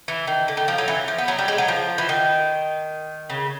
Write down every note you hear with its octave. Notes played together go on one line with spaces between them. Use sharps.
E3
D#3
D3
D#3
F3
F#3
E3
F3
B3
F#3
G3
G#3
F#3
F3
E3
D#3
C#3